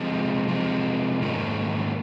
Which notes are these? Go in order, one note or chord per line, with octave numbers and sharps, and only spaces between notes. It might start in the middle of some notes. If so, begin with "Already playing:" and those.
Already playing: C3 F3 G#3
C3 F3 G#3
G#2 D#3 A#3 C#4